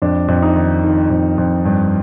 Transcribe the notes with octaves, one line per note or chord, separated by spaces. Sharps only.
F2 D4
F2
D#4
D#3
D#3
F2
F2
G2